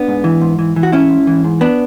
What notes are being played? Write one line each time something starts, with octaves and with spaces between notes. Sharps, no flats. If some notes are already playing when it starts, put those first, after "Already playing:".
Already playing: B3 D4
G#2
E3
G#2
E3
E3
F#4
G#2 C#4 E4
G#2
E3
G#2
B3 D4